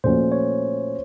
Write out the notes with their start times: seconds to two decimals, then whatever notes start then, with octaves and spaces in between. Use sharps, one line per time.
0.04 A#2 F3 A3 C#4 F#4 C5
0.32 C#5